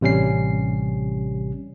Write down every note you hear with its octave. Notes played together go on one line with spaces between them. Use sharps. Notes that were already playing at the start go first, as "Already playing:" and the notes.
A1 C3 G3 C#4 C7